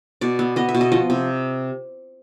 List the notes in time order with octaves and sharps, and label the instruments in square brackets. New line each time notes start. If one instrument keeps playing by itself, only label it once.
[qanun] B2 D5
B3
B3 D#5
E5
B2
D#5
F3 D#5
C3